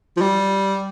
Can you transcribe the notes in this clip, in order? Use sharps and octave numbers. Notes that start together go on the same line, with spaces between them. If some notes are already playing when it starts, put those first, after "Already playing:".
F3
G3